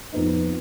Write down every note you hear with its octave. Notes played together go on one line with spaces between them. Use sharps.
F2 F3 B3 D#4